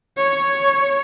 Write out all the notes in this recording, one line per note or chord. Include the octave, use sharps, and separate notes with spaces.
C#5